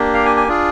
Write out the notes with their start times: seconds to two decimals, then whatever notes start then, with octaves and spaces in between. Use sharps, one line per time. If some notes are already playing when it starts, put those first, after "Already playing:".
Already playing: A#3 D4 G4
0.14 F5
0.25 G#5
0.37 G#5
0.48 D4 F4 G#4